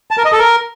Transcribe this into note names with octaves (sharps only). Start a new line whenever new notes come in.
A5
A#4
D#5
A4
A#4